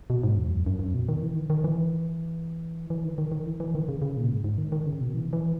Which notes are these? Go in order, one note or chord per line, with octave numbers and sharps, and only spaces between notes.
B2
G#2
E2
F#2
F#2
F#2
B2
D#3
E3
D#3
D#3
E3
E3
D#3
D#3
D#3
E3
E3
D#3
C#3
C#3
A#2
G#2
G#2
D#3
D#3
C#3
B2
E3
E3